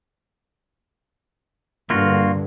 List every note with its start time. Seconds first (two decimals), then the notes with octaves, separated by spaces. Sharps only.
1.90 G2 D3 A#3 F4 F#4